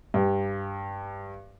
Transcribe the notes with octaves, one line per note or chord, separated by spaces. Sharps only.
G2